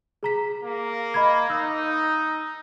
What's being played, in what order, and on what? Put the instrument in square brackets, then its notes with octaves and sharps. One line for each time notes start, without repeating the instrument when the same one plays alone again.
[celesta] G#4 A#5 B6
[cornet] A#3
[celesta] D#5 B5 G#6
[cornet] D#4 [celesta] E6